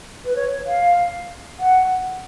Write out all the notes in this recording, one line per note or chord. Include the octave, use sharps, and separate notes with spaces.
B4
C#5
F5
F#5